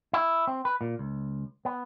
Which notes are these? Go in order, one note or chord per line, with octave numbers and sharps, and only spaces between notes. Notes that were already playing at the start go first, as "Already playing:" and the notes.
E4
C4
B4
A#2
C#2
B3